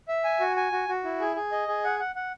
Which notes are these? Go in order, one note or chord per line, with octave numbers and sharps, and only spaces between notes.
E5
G#5
F#4
G#5
F#4
F#4
E4
G#4
G#4
D#5
G#4
F#5
F#5
F#5